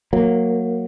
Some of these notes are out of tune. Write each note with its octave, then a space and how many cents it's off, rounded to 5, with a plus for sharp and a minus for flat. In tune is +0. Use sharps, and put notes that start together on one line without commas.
F#3 -15 A#3 -10